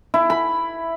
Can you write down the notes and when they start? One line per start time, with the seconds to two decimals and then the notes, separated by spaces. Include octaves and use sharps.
0.14 E4
0.30 B5